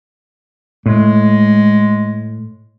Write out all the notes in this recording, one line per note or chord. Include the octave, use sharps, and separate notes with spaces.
A2 G#3